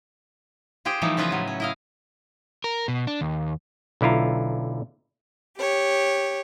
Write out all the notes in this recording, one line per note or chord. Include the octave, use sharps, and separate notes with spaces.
F4 G4 G#4 C5 G5
E3 F3 G3 A3 D#4
C#3 F3 F4 B4 D#5 E5
A2 F#3
C#4
E4 D#5 F5
A#4
B2
D4
D#2
B1 D3 E4 F4 A#5
G4 C#5